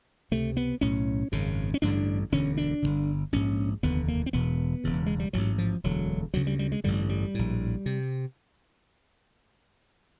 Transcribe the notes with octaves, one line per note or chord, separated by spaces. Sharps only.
C#2 C3 A3
B3
B1 A2 C#4
G#1 F#2 C#3
C#4
A1 G2 D3 D4
E1 D2 D3 C#4
D4
G1 G2 D3
A#1 G#2 C#4
F1 D#2 D3 B3
A#3
C4
E1 E2 B2 B3
E1 E2 C#3
G#3
G3
A1 G#2 F#3
F3
E1 D2 D3 F#3
D2 C#3 F#3
G3
G3
G#3
A1 G2 D3 G3
G3
A#1 A2
C3